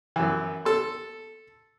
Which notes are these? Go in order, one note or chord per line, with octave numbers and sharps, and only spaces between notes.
F#2 E3
A4 C6